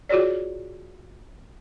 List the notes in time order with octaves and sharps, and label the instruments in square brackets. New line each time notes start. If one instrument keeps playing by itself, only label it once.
[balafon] F4 F#4 G#4 C#5 D5